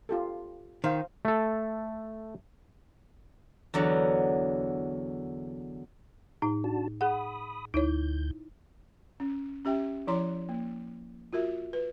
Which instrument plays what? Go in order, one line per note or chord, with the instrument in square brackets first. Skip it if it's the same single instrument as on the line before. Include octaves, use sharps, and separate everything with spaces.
[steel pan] F4 G4 A4
[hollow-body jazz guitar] D#3 [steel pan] C5 F5
[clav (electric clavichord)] A3 A4
[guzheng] E2 D3 F#3
[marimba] A2 D#4
[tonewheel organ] D4 F#4 A5
[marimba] G#4 F#5 [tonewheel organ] B5 D#6
[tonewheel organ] D2 G6 [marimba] D#4 E4 C#5
[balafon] C#4
C#4 G4 E5 G5
F3 E4 C#5 A#5 C6
A#3
F4 F#4 A#4 E5
B4